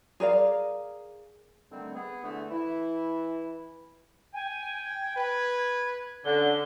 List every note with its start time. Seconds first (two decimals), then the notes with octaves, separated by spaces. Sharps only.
0.20 G#4 A#4 D5 F5
1.72 D3 D#3 G3 A3 C4
1.95 B3 G#4
2.24 D3 E3 A3
2.51 E3 E4
4.34 G5 G#5
4.85 G#6
5.16 B4
6.25 D3 C#4 G7